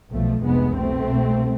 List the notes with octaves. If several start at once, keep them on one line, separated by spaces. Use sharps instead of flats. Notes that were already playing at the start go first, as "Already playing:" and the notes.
B1 B2 F3 A3
F1 F2 C3 G#3 B3
C2 B2 A3 C4
C2 B2